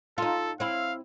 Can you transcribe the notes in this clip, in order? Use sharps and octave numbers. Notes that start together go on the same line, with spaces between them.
D#4 F4 A4
C4 E4 F5